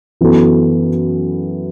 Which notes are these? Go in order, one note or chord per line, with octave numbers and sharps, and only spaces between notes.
F#2 E3 B3 F#4 A4